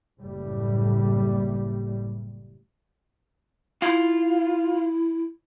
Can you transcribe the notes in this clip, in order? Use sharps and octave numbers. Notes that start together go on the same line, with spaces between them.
F#1 A2 G3
E4 F4